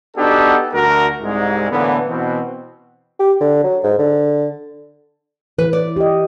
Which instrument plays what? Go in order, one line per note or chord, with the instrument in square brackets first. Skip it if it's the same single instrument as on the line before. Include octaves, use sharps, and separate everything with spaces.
[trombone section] B3 D4 D#4 F#4 G4 A4
D2 F#4 A#4
C2 G#2 G#3
A2 D3 E3 A#3 B3
B2 E3 C4
[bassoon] G4
D3
F#3
G#2
D3
[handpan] E3 [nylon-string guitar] B4
[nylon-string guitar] D5
[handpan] G4 D#5